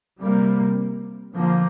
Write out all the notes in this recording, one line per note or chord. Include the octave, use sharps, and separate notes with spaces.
C3 G3 A#3
D3 F3 A#3